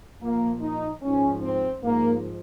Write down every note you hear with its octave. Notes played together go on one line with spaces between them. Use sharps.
A#2 F3 A#3
D#4
G#2 F3 C#4
C4
G#2 F3 A#3